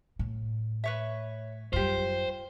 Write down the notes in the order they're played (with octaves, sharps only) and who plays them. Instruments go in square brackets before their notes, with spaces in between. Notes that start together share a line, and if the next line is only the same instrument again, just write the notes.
[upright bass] A2
[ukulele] B4 C#5 E5
[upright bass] F#2 G3 [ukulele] F4 G4 [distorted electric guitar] C5